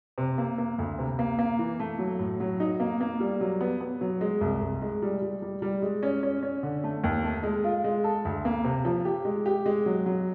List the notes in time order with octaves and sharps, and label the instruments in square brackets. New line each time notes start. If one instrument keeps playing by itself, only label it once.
[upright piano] C3
A#3
A#3
D2
C3
A#3
A#3
E3
A3
F#3
A2
F#3
D#4
A#3
A#3
G3
F#3
B3
B3
F#3
G#3
C2
C2
G#3
G3
G3
G3
G3
G#3
C#4
C#4
C#4
D3
A3
D#2
A3
G#3
F4
G#3
A4
D2
A#3
C3
F3
G4
G#3
G4
G#3
F#3
F#3